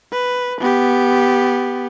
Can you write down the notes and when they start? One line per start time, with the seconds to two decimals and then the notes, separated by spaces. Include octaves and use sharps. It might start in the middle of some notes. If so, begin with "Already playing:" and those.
0.12 B4
0.60 B3 G4